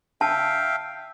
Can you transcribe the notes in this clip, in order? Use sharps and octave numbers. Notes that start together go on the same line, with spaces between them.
E5 F5 G5 A5